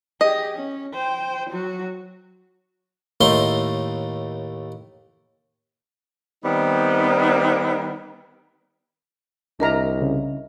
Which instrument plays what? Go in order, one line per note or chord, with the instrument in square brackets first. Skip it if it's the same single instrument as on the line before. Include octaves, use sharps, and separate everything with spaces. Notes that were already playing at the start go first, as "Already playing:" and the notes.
[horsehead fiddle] G4 G#4 [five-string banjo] D#5
[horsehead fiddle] C#4
C5 G5
F#3 F#4
[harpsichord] D#2 A2 A3 D#4 C6
[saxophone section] D#3 G3 B3 C4 D#4
[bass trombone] C2 [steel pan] D4 A#4 A#5 [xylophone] D#5 E5
[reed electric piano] C#3